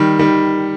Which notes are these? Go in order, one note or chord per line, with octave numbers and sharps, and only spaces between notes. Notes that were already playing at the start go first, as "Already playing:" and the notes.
Already playing: D#3 G3
D#3 G3